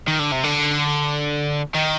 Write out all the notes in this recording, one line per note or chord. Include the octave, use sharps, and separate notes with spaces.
D#3
D3
C3
D3
D#3